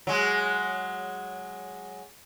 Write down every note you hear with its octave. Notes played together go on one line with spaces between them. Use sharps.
F#3 G#3